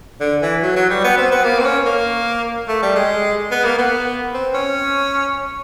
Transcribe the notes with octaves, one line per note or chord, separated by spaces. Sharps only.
D3
E3
F#3
F#3
G3
B3
C4
B3
A#3
C4
C#4
A#3
A3
G3
G#3
B3
A#3
B3
C4
C#4